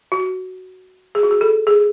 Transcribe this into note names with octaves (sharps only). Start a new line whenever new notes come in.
F#4
G#4
F#4
G#4
A4
G#4